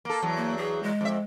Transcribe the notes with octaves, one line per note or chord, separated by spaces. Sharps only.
A#3 A4
E2 F#3
A#3
G#4
G#3
F2 E5